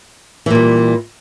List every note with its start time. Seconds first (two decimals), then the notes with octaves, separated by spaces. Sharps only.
0.46 E3
0.50 A#2
0.55 G3